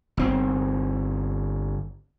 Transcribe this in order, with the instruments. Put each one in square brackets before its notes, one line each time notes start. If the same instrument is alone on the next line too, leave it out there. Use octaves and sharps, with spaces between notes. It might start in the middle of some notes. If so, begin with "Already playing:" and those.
[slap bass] G1 C4